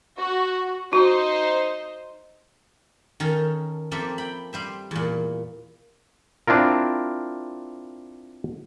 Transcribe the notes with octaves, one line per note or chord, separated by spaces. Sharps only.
F#4
D#4 F#4 C5
D#3 C#4 D#4 A4
F3 A#3 C4 G4 A4 E5
G5 B5
G3 C5 E5
E2 A#2
C4 D4 E4 F4 A#4